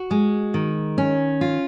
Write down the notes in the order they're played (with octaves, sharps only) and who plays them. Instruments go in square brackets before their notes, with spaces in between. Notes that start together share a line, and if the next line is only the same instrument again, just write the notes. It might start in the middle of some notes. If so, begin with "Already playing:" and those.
Already playing: [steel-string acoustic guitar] F#4
G#3
D#3
C#4
F4